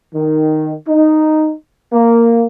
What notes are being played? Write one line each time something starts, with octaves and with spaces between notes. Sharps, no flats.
D#3
D#4
A#3